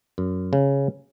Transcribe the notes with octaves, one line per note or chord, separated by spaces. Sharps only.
F#2
C#3